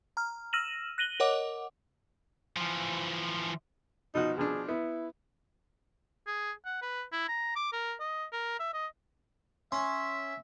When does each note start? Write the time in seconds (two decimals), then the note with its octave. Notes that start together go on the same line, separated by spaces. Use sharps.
0.17 A#5 F6
0.53 E6 F6 A#6 D#7 E7 F#7
0.98 F#6 A#6 D#7 F#7 G7
1.20 A#4 C#5 D#5 F#5 D6
2.56 E3 F3
4.15 B2 F3 D#4 F#4
4.38 B2 F3 D4 G#4
4.68 B3 E4
6.27 G#4
6.65 F#5
6.82 B4
7.12 E4
7.28 A#5
7.56 D6
7.73 A#4
8.00 D#5
8.32 A#4
8.59 E5
8.74 D#5
9.72 C#4 E5 C6